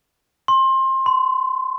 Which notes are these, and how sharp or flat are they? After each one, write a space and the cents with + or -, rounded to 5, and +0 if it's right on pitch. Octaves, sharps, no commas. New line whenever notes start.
C6 +25
C6 -30